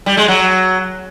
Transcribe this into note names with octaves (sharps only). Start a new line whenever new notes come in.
G3
G#3
F#3